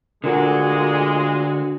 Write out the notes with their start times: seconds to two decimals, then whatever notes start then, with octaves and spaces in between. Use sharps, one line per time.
0.24 A#2 D3 G#3 F#4